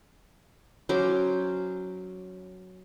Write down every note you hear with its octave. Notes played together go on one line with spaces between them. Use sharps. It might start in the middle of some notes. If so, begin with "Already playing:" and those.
F#3 C#4 C5 D6